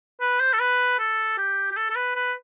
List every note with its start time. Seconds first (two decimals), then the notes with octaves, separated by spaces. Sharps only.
0.21 B4
0.40 C5
0.53 A4
0.60 B4
0.99 A4
1.38 G4
1.71 G4
1.76 A4
1.90 A4
1.96 B4
2.15 B4